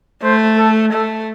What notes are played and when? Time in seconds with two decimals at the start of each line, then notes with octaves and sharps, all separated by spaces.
0.23 A3 C5
0.58 A4
0.92 A3 A4